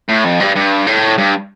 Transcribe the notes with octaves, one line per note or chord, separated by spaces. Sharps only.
A2
F2
G2
G2
A2
G2